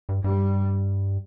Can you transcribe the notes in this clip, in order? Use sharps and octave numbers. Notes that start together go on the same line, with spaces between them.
G2
G2 G3